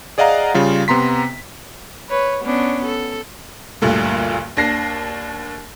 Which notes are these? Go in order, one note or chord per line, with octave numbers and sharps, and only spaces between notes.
G#4 D5 D#5 F5 F#5 A#5
C#3 G3 F4
C3 B3 A#5 C6 B6
B4 C#5
B3 C#4 D4
A4
F#1 D2 G2 A#2 D3
D#2 D4 A#6 C7